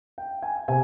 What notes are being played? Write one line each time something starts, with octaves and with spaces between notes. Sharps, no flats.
G5
G#5
C3 G#5